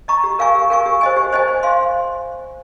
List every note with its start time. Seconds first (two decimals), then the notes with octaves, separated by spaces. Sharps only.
0.08 D#5 A#5 C#6
0.24 G4
0.39 A#4 F5 G#5 C#6
0.55 G4
0.70 A#4 F5 G#5 C#6
0.86 G4
1.01 C5 D#5 G#5
1.17 G4
1.32 C5 D#5 G#5
1.48 C5
1.63 F5 C6